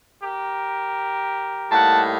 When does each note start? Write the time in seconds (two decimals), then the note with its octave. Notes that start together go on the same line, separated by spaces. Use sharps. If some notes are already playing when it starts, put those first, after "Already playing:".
0.23 G4 A#4
1.71 A2 G3 A#3 D#4 F#5 A5